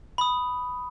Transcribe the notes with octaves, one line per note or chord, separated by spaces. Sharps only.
B5 D#6